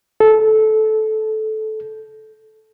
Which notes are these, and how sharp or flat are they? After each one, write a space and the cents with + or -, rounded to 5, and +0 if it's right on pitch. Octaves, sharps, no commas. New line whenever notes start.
A4 -15